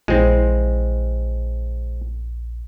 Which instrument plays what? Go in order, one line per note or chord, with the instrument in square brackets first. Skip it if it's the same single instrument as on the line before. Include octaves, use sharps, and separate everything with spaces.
[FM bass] A#1 [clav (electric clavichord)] G#3 C4 [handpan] E4 F4